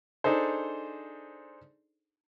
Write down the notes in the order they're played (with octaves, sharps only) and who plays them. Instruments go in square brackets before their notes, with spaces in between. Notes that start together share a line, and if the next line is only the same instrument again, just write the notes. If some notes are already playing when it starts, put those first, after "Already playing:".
[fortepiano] D4 D#4 G#4 A4 C5